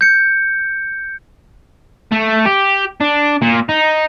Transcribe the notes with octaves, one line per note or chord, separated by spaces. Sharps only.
G6 C#7
A3
G4
D4
A#2
D#4